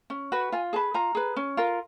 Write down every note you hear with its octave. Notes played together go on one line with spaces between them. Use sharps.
C#4
F#4 B4
F4 G#5
G#4 B4 A5
F4 A#5
G#4 B4
C#4
F4 A#4